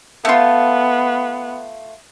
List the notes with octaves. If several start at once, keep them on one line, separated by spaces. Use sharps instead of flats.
A3 B3 F4